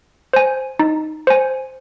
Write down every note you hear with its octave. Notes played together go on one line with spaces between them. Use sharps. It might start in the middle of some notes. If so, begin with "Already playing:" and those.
C5 G#5
D#4
C5 G#5